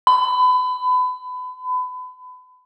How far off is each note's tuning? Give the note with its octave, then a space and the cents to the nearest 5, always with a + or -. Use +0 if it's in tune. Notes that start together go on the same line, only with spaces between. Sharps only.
B5 +30